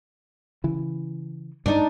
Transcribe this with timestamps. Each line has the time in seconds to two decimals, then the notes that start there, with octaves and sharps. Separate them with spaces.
0.64 C#3 E3
1.66 G2 G#3 D4 D#4